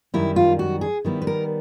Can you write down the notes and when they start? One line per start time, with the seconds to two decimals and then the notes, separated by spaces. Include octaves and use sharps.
0.14 F#2 D#3 G3 E4
0.36 F4
0.59 F#4
0.81 G#4
1.05 D#3 G3 B3 E4
1.22 B4
1.27 A#4